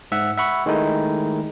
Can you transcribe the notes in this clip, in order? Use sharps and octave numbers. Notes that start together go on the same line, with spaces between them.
G#2 E5 F#5
E5 F#5 B5 C#6
D#3 G#3 A3 D#4 E4